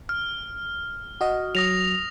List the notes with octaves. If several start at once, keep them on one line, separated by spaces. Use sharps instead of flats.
F6
F#4 D#5
F#3 D#6 A#6 F7